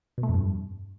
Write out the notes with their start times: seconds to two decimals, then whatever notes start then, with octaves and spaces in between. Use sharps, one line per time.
0.18 B2
0.23 A3
0.29 F2
0.34 G2